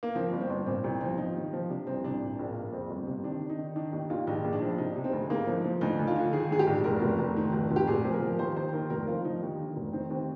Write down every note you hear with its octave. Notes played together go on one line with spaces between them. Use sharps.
A#3
F3 C4
G1
C4
G1
A#2 C4
C2 C4
F3 C4
F3 D#4
D#2
F3
C3 D4
C2 C4
C2 D4
A#2
A#1
A#3
A#1
F2 C4
G1
C3
D#3 D4
D#3
D#4
D#3
D#3 D4
D#2 D#4
D#2 F4
A#1 D#4
A#1
D4
F3
C3 D#4
C3
C4
D2
G#2 A#3
F3
F3
D2 D#4
D2
F4
D3
D#3 G#4
G#2 G#4
G4
A#1
F1 A#4
F1
F1
D#3
F1
F1
G4
A#2 G#4
F3
A#4
F3
D#2 C5
D#2 C5
D#3 A#4
F1 A#4
F3 F4
F3 D#4
D#2
D3
F1
D#3 C4
D#2 C4